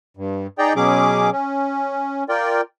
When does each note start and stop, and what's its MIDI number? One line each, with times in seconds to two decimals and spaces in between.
0.17 0.47 43
0.58 0.73 63
0.58 0.73 68
0.58 0.73 74
0.58 0.73 79
0.58 0.73 82
0.76 1.30 47
0.76 1.30 54
0.76 1.30 61
0.76 1.30 68
0.76 1.30 86
1.32 2.24 61
2.29 2.61 65
2.29 2.61 70
2.29 2.61 74
2.29 2.61 79